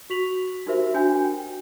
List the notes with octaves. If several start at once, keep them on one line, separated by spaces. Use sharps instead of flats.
F#4 C#6 B6 F7 F#7
D#4 F#4 G4 A#4 C5 E5
D4 F#4 G5 G#5 G6
G5